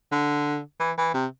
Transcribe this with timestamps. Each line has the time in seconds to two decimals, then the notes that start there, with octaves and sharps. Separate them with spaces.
0.12 D3
0.80 E3
0.98 E3
1.14 C3